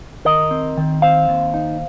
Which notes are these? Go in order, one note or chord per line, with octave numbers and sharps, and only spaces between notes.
D#3 A#4 D#5
C4
D#3
C4 C5 F5
D#2
D#4